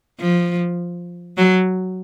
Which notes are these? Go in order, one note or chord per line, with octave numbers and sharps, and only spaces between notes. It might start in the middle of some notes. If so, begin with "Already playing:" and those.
F3
F#3